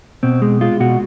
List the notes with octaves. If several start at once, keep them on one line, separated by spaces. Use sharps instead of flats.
B2 C4
G#3
G#3 F4
B2 F#4